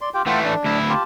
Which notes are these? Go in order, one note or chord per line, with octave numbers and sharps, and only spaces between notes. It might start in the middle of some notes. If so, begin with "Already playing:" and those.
D5 C6
F4 G4 G5
E3 A3 F4 F#5 G5
D4
D2 E4
F4 G4 A5